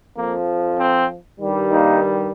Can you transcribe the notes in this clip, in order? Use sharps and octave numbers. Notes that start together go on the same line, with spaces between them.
F2 F3 A#3
C4
G2 D#3 G3
A#3 D#4